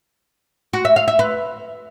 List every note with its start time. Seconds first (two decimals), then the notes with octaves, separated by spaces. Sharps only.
0.73 F#4
0.85 E5
0.96 F5
1.08 E5
1.19 B4